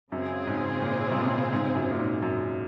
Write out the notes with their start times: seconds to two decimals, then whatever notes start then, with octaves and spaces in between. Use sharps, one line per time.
0.12 F#2 C#3 G#3 C4 F4 G#4
0.47 G#2
0.82 A#2
1.11 C3
1.17 A#2
1.52 G#2
1.75 F#2
1.91 A#2
1.99 G#2
2.22 F#2